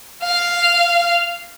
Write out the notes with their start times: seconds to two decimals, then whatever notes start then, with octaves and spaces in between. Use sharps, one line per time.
0.23 F5